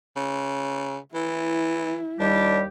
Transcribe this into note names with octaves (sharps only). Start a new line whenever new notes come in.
C#3
E3 E4
D#2 G3 D4 G4